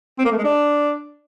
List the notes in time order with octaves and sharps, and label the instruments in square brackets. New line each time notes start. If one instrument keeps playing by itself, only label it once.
[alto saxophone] C4
A#3
A3
G#3
D4